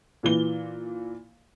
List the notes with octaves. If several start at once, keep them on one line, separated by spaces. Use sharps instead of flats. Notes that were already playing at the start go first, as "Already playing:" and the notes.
A#2 E3 G7